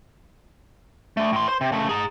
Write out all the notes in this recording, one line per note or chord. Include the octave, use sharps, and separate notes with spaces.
D3 A3
A2 C6
C5 C6
C3
C#3 A3
G#4 A#5